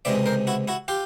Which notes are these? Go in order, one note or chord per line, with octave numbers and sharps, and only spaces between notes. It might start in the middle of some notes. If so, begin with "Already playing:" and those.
C#2 C3 E3 G#3 D5 E5
A#4 C5
E4 F#4
E4 F#4
F4 G4